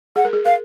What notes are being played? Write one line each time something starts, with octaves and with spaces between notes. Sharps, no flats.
G#4 F#5
A#4
G#4
A#4 F5